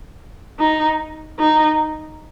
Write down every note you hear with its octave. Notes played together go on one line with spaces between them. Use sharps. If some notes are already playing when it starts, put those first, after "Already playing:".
D#4
D#4